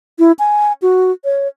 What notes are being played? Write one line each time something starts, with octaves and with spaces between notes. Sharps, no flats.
E4
G#5
F#4
C#5